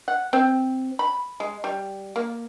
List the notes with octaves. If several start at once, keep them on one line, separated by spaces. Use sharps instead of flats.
F#5
C4
B5
G#3
G3
A#3